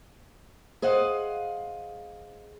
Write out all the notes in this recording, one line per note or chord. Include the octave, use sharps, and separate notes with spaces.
G#4 C5 D#5 F5 F#5